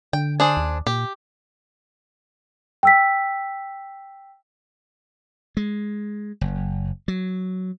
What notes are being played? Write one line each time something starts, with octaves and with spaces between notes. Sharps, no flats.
D3 G5
D4 G#4 C5
D#2
A#2 G4
G5 E6 B6
G#3
F#1
F#3